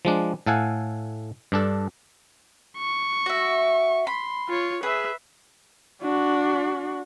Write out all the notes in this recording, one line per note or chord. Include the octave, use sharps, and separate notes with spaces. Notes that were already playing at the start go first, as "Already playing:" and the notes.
F3 G#3 D4
A2 A4 F5 F#5 G#5
G2 D4 A4
C#6
F#4 E5
B5 C6
F4 C#5
G#4 B4 E5
D4 F#4